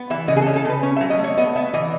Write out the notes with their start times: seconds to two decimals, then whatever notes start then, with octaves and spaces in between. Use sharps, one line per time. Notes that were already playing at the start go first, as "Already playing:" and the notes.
Already playing: B3
0.10 E3 E5
0.28 C#3 D#5
0.36 G#4
0.42 A4
0.46 C#4
0.56 A4
0.65 C#3 B4
0.83 C#4
0.96 E5
1.01 F#3
1.10 D#5
1.19 A3
1.24 C#5
1.37 B3 D#5
1.56 B3 E5
1.74 E3 D#5